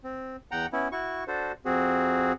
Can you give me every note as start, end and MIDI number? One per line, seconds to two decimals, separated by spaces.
0.04 0.36 60
0.51 0.66 40
0.51 0.66 78
0.51 0.66 79
0.51 0.66 82
0.73 0.88 59
0.73 0.88 61
0.73 0.88 64
0.92 1.24 64
0.92 1.24 66
0.92 1.24 85
1.27 1.52 62
1.27 1.52 66
1.27 1.52 69
1.27 1.52 72
1.65 2.33 41
1.65 2.33 60
1.65 2.33 66
1.65 2.33 68